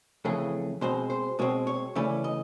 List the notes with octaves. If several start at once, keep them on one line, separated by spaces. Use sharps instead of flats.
F2 C#3 E3 A3 G#4
B2 G#3 C4 C5
C5
B2 G#3 C4 C#5
C#5
C#3 E3 A3 C#4 D5
D#5